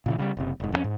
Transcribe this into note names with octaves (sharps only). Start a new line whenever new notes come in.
A#2 C#3 E3
C#3 F#3 G3
F#1 C3
F1 G#2
F2 B2 C#4
G#2